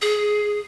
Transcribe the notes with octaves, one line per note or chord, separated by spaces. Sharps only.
G#4